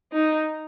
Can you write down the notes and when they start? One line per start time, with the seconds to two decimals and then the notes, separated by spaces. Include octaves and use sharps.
0.12 D#4